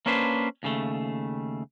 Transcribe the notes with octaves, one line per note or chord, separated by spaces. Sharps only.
A#3 C#4 D4 B4 C5
D#2 C#3 A3